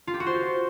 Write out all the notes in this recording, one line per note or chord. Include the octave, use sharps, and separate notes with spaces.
F4
G4
F#4
C5